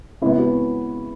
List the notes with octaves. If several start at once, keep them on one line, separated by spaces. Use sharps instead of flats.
C#3 G#3 B3 E4
F#4